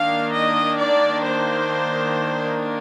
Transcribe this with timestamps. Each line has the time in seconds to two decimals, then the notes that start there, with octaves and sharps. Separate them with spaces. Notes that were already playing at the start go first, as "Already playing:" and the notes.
Already playing: D#3 A#3 D4 F5
0.32 D#5
0.78 D5
1.24 C5